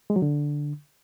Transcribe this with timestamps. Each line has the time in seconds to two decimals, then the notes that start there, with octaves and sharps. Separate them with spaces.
0.10 G#3
0.16 F#3
0.22 D3